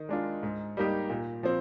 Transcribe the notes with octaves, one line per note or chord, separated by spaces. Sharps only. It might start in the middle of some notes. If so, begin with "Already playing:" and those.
Already playing: D#3
G#3 D4 F4
G#2
G3 A#3 D#4 G4
A#2
F3 C4